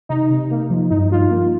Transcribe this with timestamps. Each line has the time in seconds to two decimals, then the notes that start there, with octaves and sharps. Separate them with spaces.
0.09 C3 D#4
0.31 C3
0.51 A#3
0.70 F3
0.91 G2 D#4
1.11 G2 F4
1.31 A#3